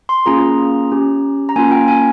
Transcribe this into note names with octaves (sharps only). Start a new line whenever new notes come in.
C6
A#3 C#4 F4 G#4 A#5
C#4 G4
A#5
A#3 C#4 F4 G#5
G5
G#5